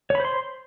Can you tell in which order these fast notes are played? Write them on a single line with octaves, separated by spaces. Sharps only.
C#5 B5 C5 C6